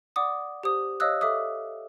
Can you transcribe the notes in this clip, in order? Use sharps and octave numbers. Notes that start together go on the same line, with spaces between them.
D5 F#5 D6 D#6
G4 C5 D#6
C#5 D#5 F5 D#6 E6 F#6
A4 E5 D6 D#6